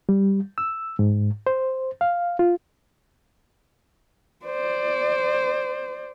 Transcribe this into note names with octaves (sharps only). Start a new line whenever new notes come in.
G3
E6
G#2
C5
F5
F4
C5 D5